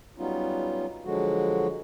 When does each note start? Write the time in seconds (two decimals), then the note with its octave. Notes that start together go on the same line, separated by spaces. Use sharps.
0.18 F#3 G3 B3 C#4 D#4 F4
1.05 D3 F3 F#3 G#3 F#4